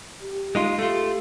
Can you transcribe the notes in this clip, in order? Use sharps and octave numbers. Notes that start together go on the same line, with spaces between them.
G4
G#3 D#4 F4
A3 F4 G4